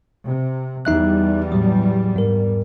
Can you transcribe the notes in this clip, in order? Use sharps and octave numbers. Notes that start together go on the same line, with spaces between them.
C3
E2 G3 D#4 E5 F#6
A2 F#3
G#2 A#4